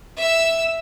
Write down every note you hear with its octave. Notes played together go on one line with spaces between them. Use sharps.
E5 E6